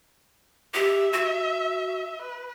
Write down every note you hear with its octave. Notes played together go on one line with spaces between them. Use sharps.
G4 E5
F#4
B4